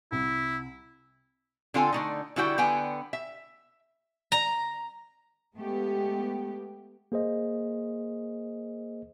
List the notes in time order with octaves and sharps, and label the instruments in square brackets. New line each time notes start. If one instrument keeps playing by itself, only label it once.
[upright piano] C2 [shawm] E4
[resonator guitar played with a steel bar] D3 C4 F4 A4 G#5
D3 A3 D#4
D3 G3 E4 F#4 B4 G5
D3 B3 G5 G#5
E5
[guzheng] A#5
[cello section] G#3 A3 B3 G4
[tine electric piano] A#3 G#4 C5 D#5